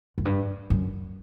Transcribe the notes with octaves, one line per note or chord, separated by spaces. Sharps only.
F#2
G2
F#2